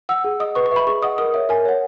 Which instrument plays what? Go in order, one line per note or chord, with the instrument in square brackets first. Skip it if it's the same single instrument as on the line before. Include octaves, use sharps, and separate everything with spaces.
[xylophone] F#5 E6
G#4
D#5 F#5 D#6
B4 C#6
C#6
E5 B5
G#4 C#6
D#5 F#5 D#6
A#4 D#6
C#5 E5
A#4 G#5
C#5 F#5